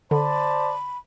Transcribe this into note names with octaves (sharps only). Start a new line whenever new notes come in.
D3 C5 D5 A5 B5